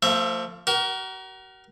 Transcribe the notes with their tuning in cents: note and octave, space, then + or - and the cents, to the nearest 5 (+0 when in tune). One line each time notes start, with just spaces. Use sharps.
F3 +0 A3 +45 E5 +0
F#4 +40 A#4 +15